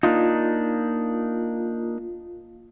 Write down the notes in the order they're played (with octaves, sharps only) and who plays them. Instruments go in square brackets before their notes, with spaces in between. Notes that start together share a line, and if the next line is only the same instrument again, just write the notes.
[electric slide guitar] A#3 D4 D#4 [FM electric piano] F4